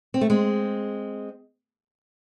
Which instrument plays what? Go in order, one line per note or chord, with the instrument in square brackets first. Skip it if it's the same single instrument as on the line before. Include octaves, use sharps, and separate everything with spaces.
[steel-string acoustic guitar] C4
A3
G#3 C4